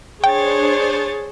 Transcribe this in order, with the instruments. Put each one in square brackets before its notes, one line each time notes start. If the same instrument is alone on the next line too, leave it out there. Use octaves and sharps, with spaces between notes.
[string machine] D4 C5 [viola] G#4 [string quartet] C#5 A6 [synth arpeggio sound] G5